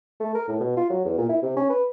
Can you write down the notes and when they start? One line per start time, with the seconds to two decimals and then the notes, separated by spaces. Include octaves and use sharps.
0.20 A3
0.35 A#4
0.48 A2
0.60 B2
0.77 F4
0.90 F#3
1.05 E2
1.18 A#2
1.29 E4
1.43 C3
1.57 C#4
1.70 B4